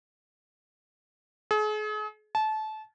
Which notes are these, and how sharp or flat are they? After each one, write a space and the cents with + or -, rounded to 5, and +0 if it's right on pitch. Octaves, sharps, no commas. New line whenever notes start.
G#4 +40
A5 -25